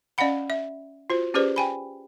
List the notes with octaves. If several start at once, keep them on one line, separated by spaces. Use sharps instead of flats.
C#4 D5 D#5 F5 F#5 B5
E5
F4 F#4 C5
C#4 G4 G#4 B4 C5 D5
G5 G#5 B5